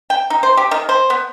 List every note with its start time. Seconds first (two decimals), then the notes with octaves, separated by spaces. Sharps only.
0.10 G5
0.30 D#4
0.43 C5
0.57 G4
0.71 D#3
0.89 C5
1.10 B3